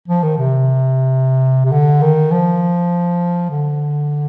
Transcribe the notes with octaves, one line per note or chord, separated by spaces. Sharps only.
F3
D#3
C3
C3
D3
D#3
F3
D3